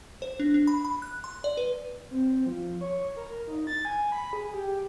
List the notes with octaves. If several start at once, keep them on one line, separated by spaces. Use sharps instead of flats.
C5
D4
D4
B5
B5
F#6
C6
D5
B4
C4
F3
C#5
A#4
D#4
A6
G#5
B5
G#4
G4